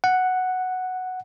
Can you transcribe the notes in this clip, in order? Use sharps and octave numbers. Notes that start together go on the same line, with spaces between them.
F#5